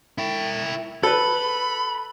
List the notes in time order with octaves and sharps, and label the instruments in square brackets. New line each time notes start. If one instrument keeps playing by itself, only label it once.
[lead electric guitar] E4 G5
[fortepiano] A4 B4 [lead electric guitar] B5